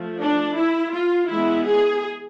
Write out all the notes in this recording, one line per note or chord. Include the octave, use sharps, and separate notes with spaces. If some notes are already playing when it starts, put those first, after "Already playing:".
Already playing: F3 A3
D4
E4
F4
E3 G#3 B3 E4
G#4